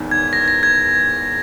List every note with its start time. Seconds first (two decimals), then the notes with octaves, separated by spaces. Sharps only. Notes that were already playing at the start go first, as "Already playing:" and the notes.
Already playing: E1 E2 D#3
0.11 G#6
0.33 A#6
0.48 A#6
0.63 G#6